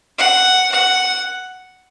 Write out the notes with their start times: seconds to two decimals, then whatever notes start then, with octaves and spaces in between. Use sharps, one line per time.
0.18 F#5
0.72 F#5